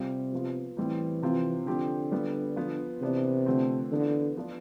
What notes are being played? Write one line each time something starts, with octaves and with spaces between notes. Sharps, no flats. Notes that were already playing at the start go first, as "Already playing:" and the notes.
Already playing: C3 G3 C4 F4
F3 B3 F4
A2 E3 G3 C4 E4
C3 F3 C4 F4
D3 F3 C4 G4
G3 B3 F4
F3 B3 F4
C3 E3 B3 D4
D3 F3 A3 C4
D3 E3 B3 F4
F3 B3 D4 F4